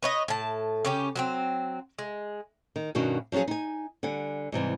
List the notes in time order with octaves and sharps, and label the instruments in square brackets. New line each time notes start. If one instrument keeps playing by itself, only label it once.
[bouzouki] B4 C#5 D#5
A2 A5
C#3 C#4 G4
F#3 B3 C4
G#3
[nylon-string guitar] D#3
G2 B2 D#3 C#4 D4 F#4
F3 F#3 C#4 F4 G#4
D#4 G#5
D3 G3 F#5 G#5
G#2 C3 E3 G3